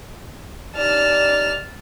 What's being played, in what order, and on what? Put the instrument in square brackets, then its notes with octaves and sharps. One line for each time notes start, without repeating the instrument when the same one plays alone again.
[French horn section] D#4 G4 D5 [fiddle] A5 F6